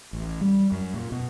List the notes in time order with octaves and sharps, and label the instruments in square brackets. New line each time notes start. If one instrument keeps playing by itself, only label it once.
[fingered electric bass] A1
G3
F#2
A#2
B2